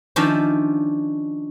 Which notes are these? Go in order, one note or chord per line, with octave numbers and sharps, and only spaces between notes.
D#3 F3 C#4 D4 E5 F5